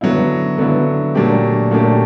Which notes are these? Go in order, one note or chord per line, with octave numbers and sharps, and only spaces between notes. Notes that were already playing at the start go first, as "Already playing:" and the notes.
D3 F#3 B3 E4
D3 F#3 B3 E4
A#2 F#3 A3 D4 G4
A#2 F#3 A3 D4 G4